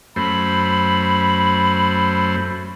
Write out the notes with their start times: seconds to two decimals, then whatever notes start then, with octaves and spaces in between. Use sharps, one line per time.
0.16 F#2 A3 C5 B5